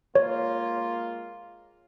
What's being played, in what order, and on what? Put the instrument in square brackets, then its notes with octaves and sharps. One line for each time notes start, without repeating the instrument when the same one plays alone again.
[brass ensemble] G#3 A#3 F4 [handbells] C#5